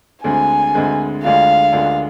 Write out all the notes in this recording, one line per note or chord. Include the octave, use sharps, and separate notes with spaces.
D2 D3 G#3 C4 G#5
D2 D3 G#3 C4
D2 D3 G#3 D4 F4 F5
D2 D3 G#3 D4 F4